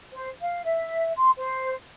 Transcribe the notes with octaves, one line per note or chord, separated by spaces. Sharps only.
C5
F5
E5
C6
C5